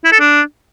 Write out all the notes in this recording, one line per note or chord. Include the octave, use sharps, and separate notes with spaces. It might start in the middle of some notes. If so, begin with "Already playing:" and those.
E4
A4
D4